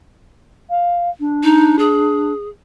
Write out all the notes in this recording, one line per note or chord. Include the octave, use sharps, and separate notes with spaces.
F5
D4
D#4
G#4